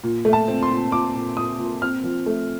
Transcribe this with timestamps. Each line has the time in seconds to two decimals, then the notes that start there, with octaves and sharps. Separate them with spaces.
0.04 A#2
0.25 A3
0.33 A5
0.48 C4
0.62 C6
0.71 A#2
0.92 A#2 D6
1.15 A#2
1.37 A#2 D#6
1.59 A#2
1.82 C4 F6
2.03 F3
2.26 A3